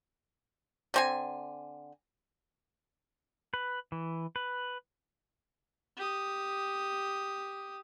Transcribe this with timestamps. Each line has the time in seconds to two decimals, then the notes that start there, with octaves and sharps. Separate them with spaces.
0.94 D3 C4 G#5
3.54 B4
3.92 E3
4.36 B4
5.97 G4 D#6